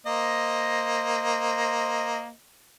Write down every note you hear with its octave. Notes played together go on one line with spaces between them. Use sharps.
A#3 C5 D#5